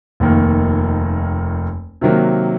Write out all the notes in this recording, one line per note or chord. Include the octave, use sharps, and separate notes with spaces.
F1 D#2 D#3 A#3
C3 D#3 F#3 A#3